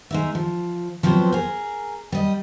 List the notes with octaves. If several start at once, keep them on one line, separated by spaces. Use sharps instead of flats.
G#3 D#4 E5
F3
F3 F#3 B3 C4 C5
G#4 A#4
G3 D#5